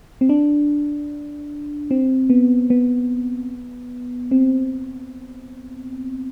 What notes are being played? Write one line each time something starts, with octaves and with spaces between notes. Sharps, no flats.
C4
D4
C4
B3
B3
C4